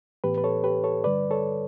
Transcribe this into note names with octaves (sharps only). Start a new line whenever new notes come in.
A2 E3 B3 G4 B4
B4
A4 C#5
G4 B4
A4 C#5
G2 D3 G3 B4 D5
A4 C#5